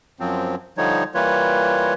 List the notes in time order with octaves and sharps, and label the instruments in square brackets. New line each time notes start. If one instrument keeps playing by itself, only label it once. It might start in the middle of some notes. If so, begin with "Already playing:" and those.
[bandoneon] F#2 F3 F#3 C4
D3 F3 G3 D#4 C#5
E3 G3 A#3 F4 B4 C#5